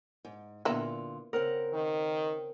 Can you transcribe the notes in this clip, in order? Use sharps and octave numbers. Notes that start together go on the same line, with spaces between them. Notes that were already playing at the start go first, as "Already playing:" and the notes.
G#2
A#2 D3 A#3 B3 E4 F4
C#3 C4 A#4 F#5
D#3